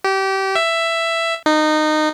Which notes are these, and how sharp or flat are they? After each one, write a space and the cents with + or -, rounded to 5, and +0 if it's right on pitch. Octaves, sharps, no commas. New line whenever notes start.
G4 -25
E5 +10
D#4 -20